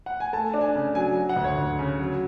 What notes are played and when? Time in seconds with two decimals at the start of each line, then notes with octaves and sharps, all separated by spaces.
0.06 F#5
0.20 G#5
0.33 A3 A5
0.54 D4
0.61 G#5
0.75 C#3
0.95 F#3 G#5
1.17 F#3
1.29 F#5
1.36 D2
1.44 C#5
1.58 D2
1.79 C#3
1.99 F#3